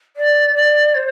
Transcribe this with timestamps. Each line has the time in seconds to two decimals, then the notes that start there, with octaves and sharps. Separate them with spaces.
0.16 D5
0.55 D5
0.95 C5